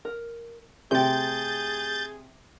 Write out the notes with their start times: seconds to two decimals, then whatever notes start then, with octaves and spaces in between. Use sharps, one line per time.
0.05 A#4
0.91 C3 A3 G4 G#4 G6 A6